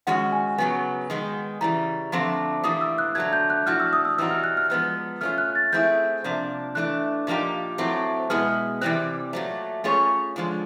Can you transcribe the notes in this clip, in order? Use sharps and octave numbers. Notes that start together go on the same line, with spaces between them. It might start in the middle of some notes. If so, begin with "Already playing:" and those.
D#3 G#3 C#4 F#4 F#5
G#5
C#3 F#3 B3 G#5
D#3 G#3 B3
C#3 E3 G3 A#5
D3 F3 A3 C4
A2 E3 G3 A#3 D#6
E6
F#6
D3 F#3 A3 G#6
G6
F#6
A2 F3 A3 D4 F#4 F6
E6
D#6
E6
E3 G3 C4 D#4 F#4 E6
F6
F#6
F6
F3 G#3 B3 D#4
A3 C#4 F4 F6
F#6
A6
A3 C4 E4 G#4 G6
C3 F3 A#3 D4
E3 A3 D4 F#6
A#2 F3 A#3 D#4 G4
A2 F#3 A3 C4
B2 G#3 B3 E4 G#4 F6
C3 E3 G3 C4 F#6
A#2 F#3 A3
A3 C#4 F4 G#4 C#5
D3 F3 G#3